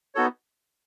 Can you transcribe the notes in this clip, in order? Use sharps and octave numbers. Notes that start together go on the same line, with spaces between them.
B3 D#4 F#4 A4 C#5